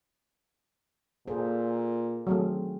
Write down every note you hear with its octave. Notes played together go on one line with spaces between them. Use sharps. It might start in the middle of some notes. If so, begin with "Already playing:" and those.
A#2 G#4 A4 C5
D#3 F#3 A3 C4 G#4